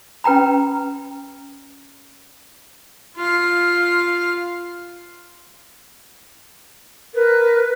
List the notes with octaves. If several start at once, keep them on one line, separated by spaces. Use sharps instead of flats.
C#4 B4 G5 A#5 B5
F4 F5
A#4 B4